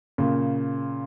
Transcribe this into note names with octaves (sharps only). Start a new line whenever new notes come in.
A#2 C#3